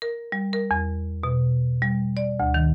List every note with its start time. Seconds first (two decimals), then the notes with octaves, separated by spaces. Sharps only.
0.02 A#4
0.32 G3
0.53 A#4
0.71 E2
1.23 B2
1.82 G3
2.17 D5
2.40 D2
2.54 D#3